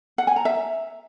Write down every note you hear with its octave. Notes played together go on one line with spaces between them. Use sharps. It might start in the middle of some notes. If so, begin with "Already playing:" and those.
F#5
G#5
A#5
E5